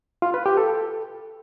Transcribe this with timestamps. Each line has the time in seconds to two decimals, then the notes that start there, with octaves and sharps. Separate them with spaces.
0.22 F4
0.34 B4
0.46 G4
0.57 A4